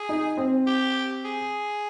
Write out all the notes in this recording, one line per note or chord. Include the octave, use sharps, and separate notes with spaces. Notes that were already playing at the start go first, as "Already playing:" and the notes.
Already playing: G#4
D#4
C4
G4
G#4